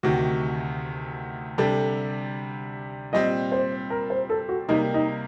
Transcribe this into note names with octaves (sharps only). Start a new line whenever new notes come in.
D2 C3 D#3 F#4
C3 G3 D4 A4
A#2 G3 C4 D#5
C5
A#4
C5
A4
F#4
C3 G3 A#3 D#4
D#4